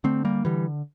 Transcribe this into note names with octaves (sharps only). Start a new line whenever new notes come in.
D3 A3 C4
G3 A#3
D3 E3 G3